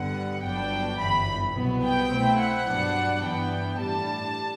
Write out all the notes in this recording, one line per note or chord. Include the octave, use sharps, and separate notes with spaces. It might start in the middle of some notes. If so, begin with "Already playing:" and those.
Already playing: G2 D3 G3 B3 F#5
G1 G2 F#3 B3 D4 G5
G1 F#2 E3 B5
C2 B2 F#3 B3
G5
B2 A3 C4 E4
F#5
G2 F#3 B3 D4
G2 E3 B3 D4 G5
A2 E3 G3 D4 A5